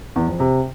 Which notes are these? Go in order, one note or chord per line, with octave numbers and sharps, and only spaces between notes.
E2
F2
C3